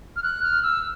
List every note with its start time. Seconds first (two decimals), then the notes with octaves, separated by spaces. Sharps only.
0.16 F6
0.23 F#6
0.43 F6
0.63 E6